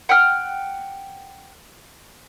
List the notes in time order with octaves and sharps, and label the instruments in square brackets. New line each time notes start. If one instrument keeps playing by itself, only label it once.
[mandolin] F#5 G5 F6